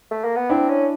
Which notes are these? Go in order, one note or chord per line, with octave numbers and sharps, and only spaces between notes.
A3
A#3
B3
C4 D4 E4
C#4